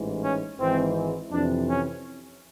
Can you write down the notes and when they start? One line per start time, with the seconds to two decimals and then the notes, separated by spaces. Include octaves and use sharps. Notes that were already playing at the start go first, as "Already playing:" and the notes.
Already playing: A1 G#2 E3
0.22 C#4
0.59 G#1 G#2 E3 C4
1.31 F2 C3 E3 D4
1.68 C#4